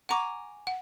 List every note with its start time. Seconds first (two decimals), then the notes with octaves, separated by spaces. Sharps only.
0.09 F#5 G#5 A#5 C#6 D6
0.67 F#5